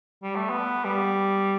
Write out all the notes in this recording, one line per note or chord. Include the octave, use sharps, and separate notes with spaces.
G3
A3
B3
G3